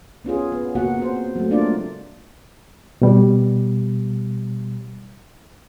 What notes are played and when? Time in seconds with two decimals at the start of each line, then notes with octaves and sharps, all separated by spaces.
0.25 B3 C#4 F4 G#4
0.52 B3
0.75 C#3 A#3 B3 F#4 F#5
0.99 C4 C5
1.35 F#3 A3
1.50 G#3 A#3 D4 F4 D5
3.02 B2 G3